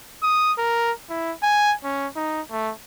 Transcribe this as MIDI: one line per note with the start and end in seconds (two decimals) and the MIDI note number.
0.23 0.53 87
0.58 0.92 70
1.09 1.33 64
1.43 1.74 80
1.84 2.07 61
2.16 2.41 63
2.51 2.72 57